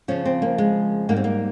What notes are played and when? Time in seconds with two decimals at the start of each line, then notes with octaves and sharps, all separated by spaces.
0.08 F2 C#3 F3 C#4
0.25 C4
0.42 A#3
0.58 G#3
1.09 G#2 G3 A#3
1.16 C4
1.24 A#3